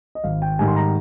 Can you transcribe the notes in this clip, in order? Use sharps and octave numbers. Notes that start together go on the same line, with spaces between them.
D#5
G#1 F5
G5
G#2 D#3 G3 G#5
C6
A#5